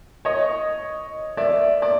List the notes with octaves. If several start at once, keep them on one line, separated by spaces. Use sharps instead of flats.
C#5 D#5
D5 E5
D5